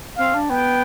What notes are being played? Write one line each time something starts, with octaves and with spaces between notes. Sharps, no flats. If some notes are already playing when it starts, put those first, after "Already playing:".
C4 F5
D4
B3 G5